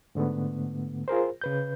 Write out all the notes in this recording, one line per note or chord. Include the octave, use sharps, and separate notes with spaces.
G#2 D3 A3 B3
F4 G#4 A#4 C5
C#3 B4 G6